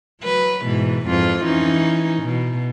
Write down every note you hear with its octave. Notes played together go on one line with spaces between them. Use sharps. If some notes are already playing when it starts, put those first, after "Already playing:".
F#3 B4
G#2 B2 E3
F2 G#2 F4
E3 C#4 D#4
B2